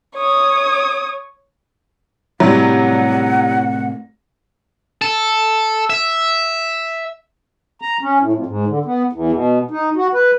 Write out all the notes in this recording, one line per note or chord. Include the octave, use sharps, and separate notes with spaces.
C#5 D#6
A2 C3 F#3 G3 E4 C#5 F#5
A4
E5
A#5
C#4
A2
F2
G#2
D3
B3
E2
B2
D#4
F#4
B4